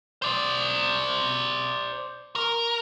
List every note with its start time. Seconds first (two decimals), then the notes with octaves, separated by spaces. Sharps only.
0.22 C5 D5
2.36 A#4